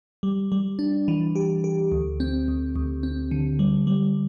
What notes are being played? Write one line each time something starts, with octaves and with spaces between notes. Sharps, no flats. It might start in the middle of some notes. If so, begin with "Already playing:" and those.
G3
G3
D4
E3
G4
G4
D2
C4
D2
D2
C4
D3
G3
G3